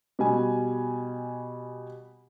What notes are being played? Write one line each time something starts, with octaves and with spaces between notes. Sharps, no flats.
B2 G3 G#5